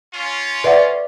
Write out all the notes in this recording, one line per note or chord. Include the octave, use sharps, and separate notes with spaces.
C#4 F4
B4 D5 E5 F#5